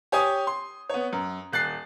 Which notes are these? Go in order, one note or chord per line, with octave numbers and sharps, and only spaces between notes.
G4 C#5 G#5 D#6
C6
B3 C#5
F#2
D#1 F#6 A6 C7